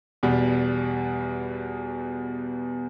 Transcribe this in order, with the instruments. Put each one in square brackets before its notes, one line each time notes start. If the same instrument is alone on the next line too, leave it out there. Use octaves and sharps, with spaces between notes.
[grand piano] E2 B2 G3